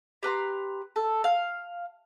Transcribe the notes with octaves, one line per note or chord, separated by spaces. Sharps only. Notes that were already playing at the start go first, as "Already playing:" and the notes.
G4 B4 A#5 C6
A4
F5